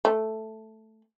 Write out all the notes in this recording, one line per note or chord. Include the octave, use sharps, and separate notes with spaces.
A3